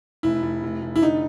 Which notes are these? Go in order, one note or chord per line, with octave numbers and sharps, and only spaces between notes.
F1 E4
F1
F1
F1
E4
D3 D#4